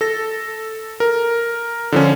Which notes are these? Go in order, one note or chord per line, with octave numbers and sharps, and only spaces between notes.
A4 A#6
A#4
D3 F3 C#4